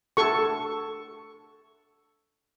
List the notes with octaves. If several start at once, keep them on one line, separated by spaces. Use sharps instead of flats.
A4 C#6